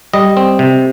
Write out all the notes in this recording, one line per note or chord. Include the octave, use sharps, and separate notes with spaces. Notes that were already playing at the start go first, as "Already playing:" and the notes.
G3 D#5
C4
C3